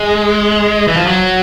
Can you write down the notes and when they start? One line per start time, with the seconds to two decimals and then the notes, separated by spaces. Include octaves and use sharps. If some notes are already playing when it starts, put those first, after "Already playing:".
Already playing: G#3
0.88 E3
0.97 F3
1.07 F#3